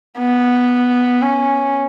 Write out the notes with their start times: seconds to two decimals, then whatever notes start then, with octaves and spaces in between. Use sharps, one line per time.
0.19 B3
1.22 C#4